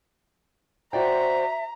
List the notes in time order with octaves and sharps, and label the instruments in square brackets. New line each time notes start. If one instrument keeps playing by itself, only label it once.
[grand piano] F#4 D5 G5 [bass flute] C5 [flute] E5 [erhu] A#5